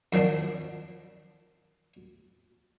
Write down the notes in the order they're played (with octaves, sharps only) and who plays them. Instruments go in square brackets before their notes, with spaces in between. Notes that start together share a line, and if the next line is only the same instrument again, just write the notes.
[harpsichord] F#2 D#3 F3 C4 D4